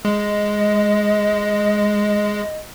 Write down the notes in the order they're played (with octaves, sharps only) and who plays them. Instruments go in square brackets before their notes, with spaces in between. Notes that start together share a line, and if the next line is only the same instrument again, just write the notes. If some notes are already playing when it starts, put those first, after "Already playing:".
[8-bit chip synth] G#3 [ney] D#5